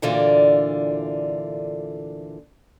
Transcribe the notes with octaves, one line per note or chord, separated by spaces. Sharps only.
D2 A#2 D3 E3 F4 D5